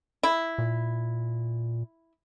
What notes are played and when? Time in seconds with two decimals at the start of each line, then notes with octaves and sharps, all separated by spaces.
0.23 E4
0.58 A#2